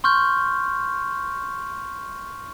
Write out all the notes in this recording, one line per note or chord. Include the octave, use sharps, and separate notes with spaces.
C6 C#6 F6 G6